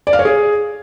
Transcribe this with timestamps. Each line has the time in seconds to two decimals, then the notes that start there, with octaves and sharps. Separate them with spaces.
0.07 D5
0.13 F5
0.19 C#5
0.25 G#4